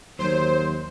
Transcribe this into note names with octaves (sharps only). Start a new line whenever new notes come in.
D#2 F#3 C5